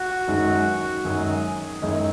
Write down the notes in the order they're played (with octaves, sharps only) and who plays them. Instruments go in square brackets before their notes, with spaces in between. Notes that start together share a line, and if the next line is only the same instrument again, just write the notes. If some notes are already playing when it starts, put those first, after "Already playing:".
Already playing: [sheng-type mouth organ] F#4
[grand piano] F#2 D#3 G#3 D#4
[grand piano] F#2 D#3 G#3 D#4 [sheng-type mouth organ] G#4
[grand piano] F#2 D#3 G#3 D#4 [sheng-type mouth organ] E4